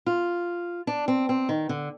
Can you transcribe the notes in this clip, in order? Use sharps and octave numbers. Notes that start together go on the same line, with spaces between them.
F4
D4
C4
C4
D#3
D3